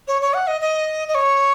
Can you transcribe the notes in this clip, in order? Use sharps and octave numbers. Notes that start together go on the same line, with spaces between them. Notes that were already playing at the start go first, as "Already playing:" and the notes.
C#5
C#5
F#5
D#5
D#5
D#5
C#5